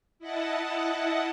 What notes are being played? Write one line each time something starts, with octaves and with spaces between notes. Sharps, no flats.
E4 D#5 F#5 A5